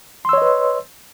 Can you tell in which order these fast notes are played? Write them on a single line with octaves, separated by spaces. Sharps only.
C6 E6 C#5 D#5 B4